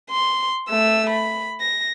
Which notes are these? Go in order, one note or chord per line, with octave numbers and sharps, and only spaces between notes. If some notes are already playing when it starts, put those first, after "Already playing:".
C6
A3 E6
B5
A#6